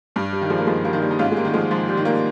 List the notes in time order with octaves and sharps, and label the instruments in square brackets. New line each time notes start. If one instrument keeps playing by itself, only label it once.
[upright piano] G2 G3
G3
D#3
F3 G#3
A#3
G2 F3 G#3
G3 A#3
D#3
G3 A#3
D#4
G#2 C#4 F4
G#3
G3 A#3
D#3
F3 G#3
G#2 F3
G3
D#3
G3 A#3